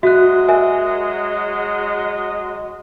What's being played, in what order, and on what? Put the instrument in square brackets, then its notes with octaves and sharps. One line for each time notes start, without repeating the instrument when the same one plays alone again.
[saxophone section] F#3 G#3 D#5 [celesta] F#4 F#6 [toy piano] E5
[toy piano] A#4 E5 G#5